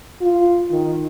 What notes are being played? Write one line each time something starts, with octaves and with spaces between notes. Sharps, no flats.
F4
D#3